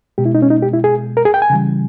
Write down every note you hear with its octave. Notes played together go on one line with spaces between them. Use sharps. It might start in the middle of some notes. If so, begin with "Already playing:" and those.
B2 G#3 G4
E4
D#4
C#4
D#4
G4
E4
G#4
A#4
G#4
G5
G#5
C#3 E3 G3